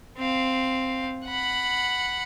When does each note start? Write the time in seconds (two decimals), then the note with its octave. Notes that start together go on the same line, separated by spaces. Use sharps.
0.17 C4 F5
1.26 F#5 B5